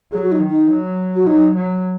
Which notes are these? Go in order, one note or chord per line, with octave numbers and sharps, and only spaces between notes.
F#3 G#4
F#4
D#4
D#3
D#4
F#3
F#4
F#3 D#4
F#3